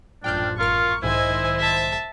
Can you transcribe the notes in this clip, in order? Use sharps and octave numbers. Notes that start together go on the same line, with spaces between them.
A1 F#2 F3 D4 G5 F6 G6
G#1 F4 A#4 C#6 F6
B1 G#2 D#3 E4 C5 D#5 G#5 E6
E5 A5